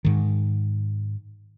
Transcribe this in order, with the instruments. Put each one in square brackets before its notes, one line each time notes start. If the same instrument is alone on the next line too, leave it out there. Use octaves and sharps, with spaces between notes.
[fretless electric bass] G#2 D#3